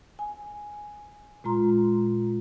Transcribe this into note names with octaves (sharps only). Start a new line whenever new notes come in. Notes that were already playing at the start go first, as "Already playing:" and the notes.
G#5
A#2 G#3 F4 A#5 C6